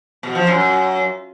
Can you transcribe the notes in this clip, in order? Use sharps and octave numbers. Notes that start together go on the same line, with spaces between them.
B2
F3
F#2